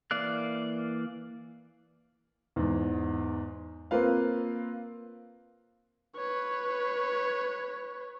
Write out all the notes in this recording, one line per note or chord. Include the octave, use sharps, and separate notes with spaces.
E3 A#3 D5 F5 F#6
E2 G#2
A#3 C4 F4 B4 F5
B4 C#5